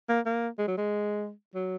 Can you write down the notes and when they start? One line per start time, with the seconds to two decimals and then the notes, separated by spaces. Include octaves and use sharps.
0.09 A#3
0.26 A#3
0.58 G#3
0.68 F#3
0.77 G#3
1.55 F#3